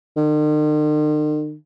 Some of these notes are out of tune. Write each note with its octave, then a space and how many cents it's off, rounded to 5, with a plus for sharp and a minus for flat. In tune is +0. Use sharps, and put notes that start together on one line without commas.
D#3 -45